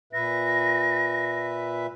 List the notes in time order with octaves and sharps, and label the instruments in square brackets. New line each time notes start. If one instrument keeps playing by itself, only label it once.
[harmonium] A#2 B4 E5 [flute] A#6